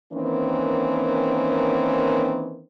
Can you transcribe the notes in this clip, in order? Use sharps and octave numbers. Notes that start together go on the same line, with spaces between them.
D#3 E3 A#3 C4 C#4